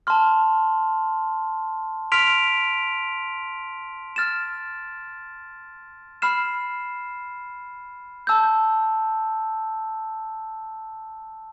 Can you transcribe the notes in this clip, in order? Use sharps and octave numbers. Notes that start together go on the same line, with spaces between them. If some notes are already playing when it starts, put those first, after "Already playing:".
A5 C6 F6
C6 F6 B6 D7 F7
F6 A6 E7
B5 F6 C7 E7
A5 E6 G6